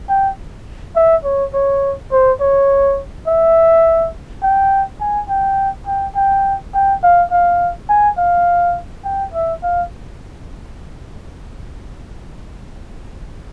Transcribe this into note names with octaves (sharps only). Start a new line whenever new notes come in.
G5
E5
C#5
C#5
C5
C#5
E5
G5
G#5
G5
G5
G5
G5
F5
F5
G#5
F5
G5
E5
F5